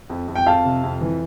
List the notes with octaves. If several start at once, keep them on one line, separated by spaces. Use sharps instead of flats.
F2
F2
G5
F2 F5 A5
C3
F2
E3